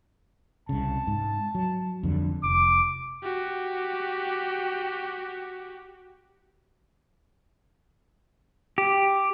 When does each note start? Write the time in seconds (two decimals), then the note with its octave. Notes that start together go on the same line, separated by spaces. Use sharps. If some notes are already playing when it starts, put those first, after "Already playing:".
0.69 C2 C#3 A5
1.07 G#2
1.55 F#3
2.03 F2 D3 G3
2.44 F1 D6
3.23 F#4 G4
8.78 G4